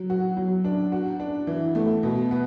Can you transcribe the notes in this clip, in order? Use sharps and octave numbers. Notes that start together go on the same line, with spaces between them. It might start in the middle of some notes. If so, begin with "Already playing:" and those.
Already playing: F#3
F#4
F#3
D4
F#4
D4
E3
A3
B2
B3